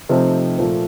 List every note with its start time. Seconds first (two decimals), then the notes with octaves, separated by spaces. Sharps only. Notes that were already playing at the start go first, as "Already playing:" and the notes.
0.09 C3 F3 A3 C4 D#4
0.59 A#2 F3 A3